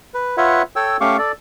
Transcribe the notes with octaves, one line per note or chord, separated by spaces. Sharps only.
B4
F4 B4 C#5 E5 F#5
A4 C#5 G5 E6
A3 C#4 G4 F5 C#6 D6
A4 D5